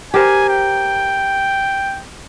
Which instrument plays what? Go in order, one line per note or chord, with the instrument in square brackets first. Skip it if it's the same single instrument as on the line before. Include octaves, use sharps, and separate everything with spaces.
[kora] G4 A#4 C5 [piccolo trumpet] G#5
[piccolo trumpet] G5